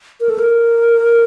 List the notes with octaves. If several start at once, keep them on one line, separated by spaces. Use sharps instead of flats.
A#4
A4
A#4